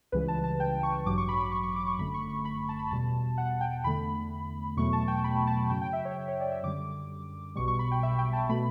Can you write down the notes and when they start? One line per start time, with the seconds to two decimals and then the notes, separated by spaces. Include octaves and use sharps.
0.12 C#2 C#3 E3 G3 B4
0.28 A5
0.44 A5
0.60 G5
0.83 C#6
1.06 A1 G2 F#3 D6
1.18 C#6
1.29 B5
1.41 B5
1.52 C#6
1.63 C#6
1.76 D6
1.87 C#6
1.98 G1 F#2 D3 A3 B5
2.14 C#6
2.30 C#6
2.45 B5
2.69 A5
2.79 B5
2.91 E2 B2 G3 A5
3.38 F#5
3.61 G5
3.84 E2 D3 A3 B5
4.77 E2 B2 F#3 A3 C#6
4.93 A5
5.08 G5
5.24 B5
5.47 A5
5.70 F#2 C#3 F#3 G5
5.82 G5
5.93 E5
6.05 C#5
6.28 C#5
6.40 D5
6.52 E5
6.63 F#2 D3 G3 D6
7.55 B1 B2 G3 C#6
7.68 C#6
7.79 B5
7.91 G5
8.03 E5
8.19 G5
8.33 A5
8.49 B2 A3 B5